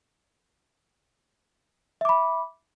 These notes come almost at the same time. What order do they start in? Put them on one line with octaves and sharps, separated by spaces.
E5 D6 B5